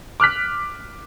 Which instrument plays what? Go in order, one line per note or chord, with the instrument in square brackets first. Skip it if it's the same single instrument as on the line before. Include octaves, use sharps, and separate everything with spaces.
[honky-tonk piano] D6 F6 F#6 B6